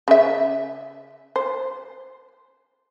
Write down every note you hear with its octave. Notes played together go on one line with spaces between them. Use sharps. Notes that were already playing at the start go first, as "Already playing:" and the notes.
C#3 E5
C5